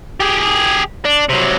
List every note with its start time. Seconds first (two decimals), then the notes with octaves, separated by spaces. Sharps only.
0.20 G4 G#4
1.05 D4
1.29 C3 F#3